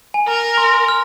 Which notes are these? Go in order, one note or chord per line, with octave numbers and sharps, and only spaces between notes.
G#5
A#4 A#5
C6
F6